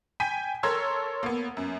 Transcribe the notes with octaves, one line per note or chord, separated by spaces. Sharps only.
G5 G#5 B6 D#7
A4 A#4 C#5 C6 E6 G#6
A#3 B3
F#2